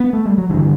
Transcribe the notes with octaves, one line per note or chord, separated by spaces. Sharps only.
B3
A3
G3
F#3
G2 D3 E3